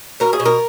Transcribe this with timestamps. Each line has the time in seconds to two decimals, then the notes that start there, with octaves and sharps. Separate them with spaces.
0.20 B2 A#4
0.33 G#4
0.40 B2
0.46 A#4